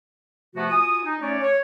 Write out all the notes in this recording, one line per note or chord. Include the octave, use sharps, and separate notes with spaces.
C3 F3 A3 B3 F#4
F4 F#4 G#5 D#6
D#4
A3 C#4 D#4 C#5 D5
C#5